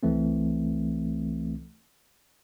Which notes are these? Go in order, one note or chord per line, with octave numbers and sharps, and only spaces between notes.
C2 E3 A3 C4